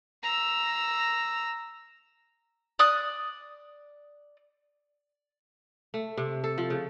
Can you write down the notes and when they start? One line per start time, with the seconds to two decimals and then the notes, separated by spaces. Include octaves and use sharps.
0.23 A#5 E6
2.79 D5 D#6 F#6
5.94 A3
6.17 C3
6.44 A4
6.58 F3
6.70 C#3